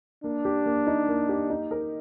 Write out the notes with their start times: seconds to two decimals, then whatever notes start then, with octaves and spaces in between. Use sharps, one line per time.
0.23 A#3 D4
0.45 G4
0.66 A#3
0.87 D#4
1.09 A#3
1.29 G4
1.50 D#4
1.71 A#4